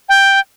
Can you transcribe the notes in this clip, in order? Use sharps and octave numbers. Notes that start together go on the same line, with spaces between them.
G5